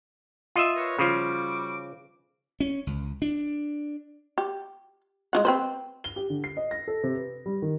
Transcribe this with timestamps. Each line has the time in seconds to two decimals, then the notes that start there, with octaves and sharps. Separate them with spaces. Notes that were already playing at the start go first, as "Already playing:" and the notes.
0.56 F4 D#5 E5
0.76 A#4 B4 C#5
0.99 C#3 F3 G3 F#4 D6
2.60 C#4
2.87 C#2
3.22 D4
4.38 G4
5.33 G#3 F4 F#5
5.45 C4 B4 C5
6.04 G7
6.16 G4
6.30 D3
6.44 C7
6.57 D#5
6.71 A#6
6.88 A4
7.04 C3
7.16 B4
7.46 G3
7.62 D#3